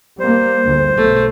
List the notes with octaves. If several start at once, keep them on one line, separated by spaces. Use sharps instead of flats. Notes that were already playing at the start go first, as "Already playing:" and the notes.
G3 A#3 C5
G1 D2
B1 A3